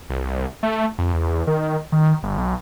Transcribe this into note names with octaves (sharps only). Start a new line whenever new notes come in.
C2
A3
F2
E2
D#3
D#3
G1
B1